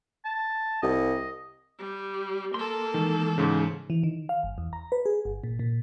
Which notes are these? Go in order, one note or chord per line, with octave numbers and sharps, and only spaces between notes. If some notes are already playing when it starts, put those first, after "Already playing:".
A5
C2 D#5
G3
A#3 A4 C6
D#3 E3 G#3
G#2 C#3
E3
D#3
F5
G1
E2
A#5
B4
G#4
G1
A#2
A#2